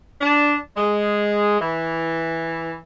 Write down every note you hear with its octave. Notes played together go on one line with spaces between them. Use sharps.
D4
G#3
E3